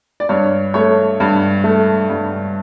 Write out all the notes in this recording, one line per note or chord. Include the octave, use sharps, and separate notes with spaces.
D5
G2 C#5
A3 C#5
G2
A3
G2